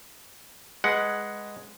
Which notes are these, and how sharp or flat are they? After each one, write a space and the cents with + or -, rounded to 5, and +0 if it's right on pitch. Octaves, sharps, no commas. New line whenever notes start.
G#3 +0 B4 -15 F#5 +0